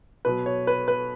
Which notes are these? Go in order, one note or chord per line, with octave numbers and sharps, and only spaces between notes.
B2 F#3 B4
C#5
B4
B4